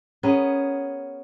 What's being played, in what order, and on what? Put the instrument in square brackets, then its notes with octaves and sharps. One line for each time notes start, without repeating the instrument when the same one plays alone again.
[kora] B3 C#4 G#4 A#4